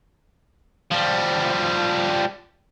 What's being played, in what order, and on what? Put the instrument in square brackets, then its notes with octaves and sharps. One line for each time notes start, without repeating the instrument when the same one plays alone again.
[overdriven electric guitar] F3 G3